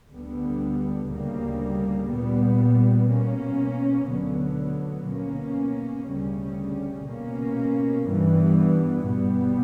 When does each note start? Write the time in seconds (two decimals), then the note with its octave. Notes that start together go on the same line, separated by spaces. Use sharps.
0.11 D2 D3 G3 B3
1.11 D2 C#3 G3 A#3
2.10 A#2 G3 B3
3.09 B2 A#3 C#4
4.08 D2 D3 F#3 B3
5.08 B2 A#3 C#4
6.08 D2 C#3 G3 C#4
7.08 B2 A#3 C#4
8.06 G2 E3 G3 B3
9.06 B2 G3 B3